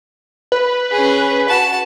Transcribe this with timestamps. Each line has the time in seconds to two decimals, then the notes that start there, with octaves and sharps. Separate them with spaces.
0.52 B4
0.91 C#4 G#4
1.49 F#4 A5